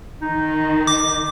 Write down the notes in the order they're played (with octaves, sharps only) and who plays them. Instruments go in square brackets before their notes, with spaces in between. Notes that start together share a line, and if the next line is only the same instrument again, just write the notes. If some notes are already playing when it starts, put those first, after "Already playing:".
[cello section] D#3 [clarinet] D#4
[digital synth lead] D6